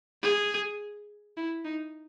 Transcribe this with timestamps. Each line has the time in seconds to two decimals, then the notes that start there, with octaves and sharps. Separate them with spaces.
0.23 G#4
1.37 E4
1.64 D#4